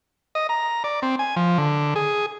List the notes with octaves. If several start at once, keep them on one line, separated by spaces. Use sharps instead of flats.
D#5
A#5
D5
C4
G#5
F3
D3
G#4